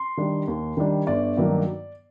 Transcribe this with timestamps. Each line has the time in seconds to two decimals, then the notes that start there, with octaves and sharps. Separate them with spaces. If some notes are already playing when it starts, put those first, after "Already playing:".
Already playing: C6
0.17 D#3 G3 D4
0.48 D#2
0.77 D#3 G3 D4
1.07 G1 D5
1.37 G2 D#3 F#3 A#3